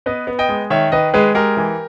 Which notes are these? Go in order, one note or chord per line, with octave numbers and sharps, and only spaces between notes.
B3 B4 D#5
B3
D#5 G5
G#3
D#3 C#5 E5
D#3 B4 D#5
G#3 G#4 B4
G#3 G4 A#4
E3